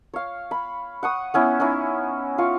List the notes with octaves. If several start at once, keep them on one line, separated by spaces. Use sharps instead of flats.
C#5 F5
B5
F#5 C#6 D#6
B3 C#4 E4
C#4 D#4 E4
F4 F5 C#6